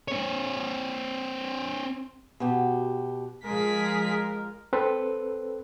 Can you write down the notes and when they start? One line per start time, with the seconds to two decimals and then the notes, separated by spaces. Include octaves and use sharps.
0.08 C4 C#5
2.40 B2 F#4 G4
3.45 F3 G#3 G#4 A#4 B6
4.73 C4 A4 B4 C5